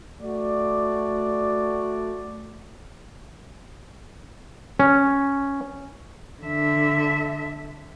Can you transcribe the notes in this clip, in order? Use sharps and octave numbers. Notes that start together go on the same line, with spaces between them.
A3 F#4 D5
C#4
D3 E5